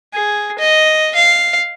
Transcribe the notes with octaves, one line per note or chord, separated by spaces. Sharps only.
G#4
D#5
F5